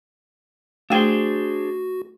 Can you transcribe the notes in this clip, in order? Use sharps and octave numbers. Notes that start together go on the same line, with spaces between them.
A3 D4 F#4 G#4 C5 G5